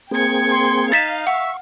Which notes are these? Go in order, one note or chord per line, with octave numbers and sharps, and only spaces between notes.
A#3 C4 G#4 G5 G#6 C#7
C6
D#4 F5 A6 B6 E7
E5 F#5 C#6